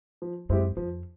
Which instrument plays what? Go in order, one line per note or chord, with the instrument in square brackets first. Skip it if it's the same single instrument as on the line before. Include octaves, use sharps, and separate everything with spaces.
[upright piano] F3
[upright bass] F#2 [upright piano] G#3 C4 E4 G4
[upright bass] F2 [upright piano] F3